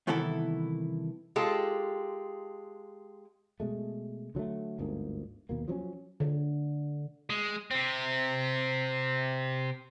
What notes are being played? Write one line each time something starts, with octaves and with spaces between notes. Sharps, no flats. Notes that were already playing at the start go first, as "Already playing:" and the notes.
C2 D#3 E3 B3 E4 A4
G#3 F4 G4 A4
B2 G#3 A3
D3 F#3 G3 A3
G1 D2 G#2 A#3
D#2 B2 A#3
F3 F#3 A#3 C#4
D3
G#3
C3 C4